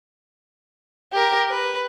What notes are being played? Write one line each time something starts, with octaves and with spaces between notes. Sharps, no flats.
G4 A#4
B4